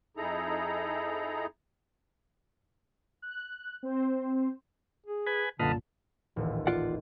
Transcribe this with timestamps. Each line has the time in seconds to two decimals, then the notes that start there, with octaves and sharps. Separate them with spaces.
0.17 F2 D#4 E4 G#4 A4 A#5
3.22 F#6
3.83 C4 C5
5.06 G#4
5.27 B4 G#5
5.59 C2 F#2 A#2 D3 B4 D#5 F5 A5
6.36 D#1 A1
6.67 F4 D5 F#5